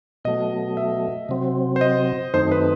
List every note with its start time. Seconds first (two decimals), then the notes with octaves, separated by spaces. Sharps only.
0.25 B2 F#3 A3 D#5
0.77 E5
1.29 C3 F#3 C4
1.76 C5
1.81 D#5
2.34 F#2 D#3 A3 C4 D#4 C5
2.51 B4